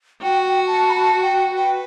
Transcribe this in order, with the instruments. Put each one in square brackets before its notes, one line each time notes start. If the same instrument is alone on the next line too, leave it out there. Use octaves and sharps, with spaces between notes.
[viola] F#4 [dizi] G5
[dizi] G5
A5
B5
A5
G5
[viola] B4 [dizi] G5